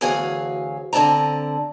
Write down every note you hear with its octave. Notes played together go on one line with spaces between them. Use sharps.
D2 E3 F#3 G#4 C#5 F5
D3 C4 D5 A5 A#5